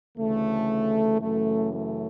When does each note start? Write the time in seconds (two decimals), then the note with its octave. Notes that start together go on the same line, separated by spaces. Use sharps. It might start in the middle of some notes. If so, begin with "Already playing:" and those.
0.17 D2 C#3 E3 A3
1.21 F#2 C#3 E3 A3
1.73 A3